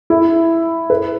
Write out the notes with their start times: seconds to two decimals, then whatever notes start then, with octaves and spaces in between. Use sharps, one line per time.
0.10 E4
0.90 B4